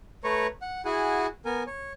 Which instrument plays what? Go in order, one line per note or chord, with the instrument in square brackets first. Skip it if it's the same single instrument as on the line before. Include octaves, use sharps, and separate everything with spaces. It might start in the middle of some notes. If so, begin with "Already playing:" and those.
[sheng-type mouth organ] A3 B4 C#5 A#5 C#6
F#5
E4 F#4 G#4 F#5 G#5
B3 A#4 G#5
C#5